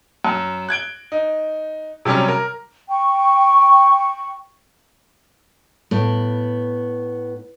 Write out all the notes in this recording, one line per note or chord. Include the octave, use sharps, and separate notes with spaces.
F#2
F#6 G#6 D7 G7
D#4
C3 F#3 G3 C#4 D6
A#4
G5 C#6
A2 B3